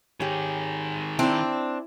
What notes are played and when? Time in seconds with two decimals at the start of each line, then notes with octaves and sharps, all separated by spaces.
0.21 D#3 G4 G#4 C#5
1.19 C4 D4 E4 D5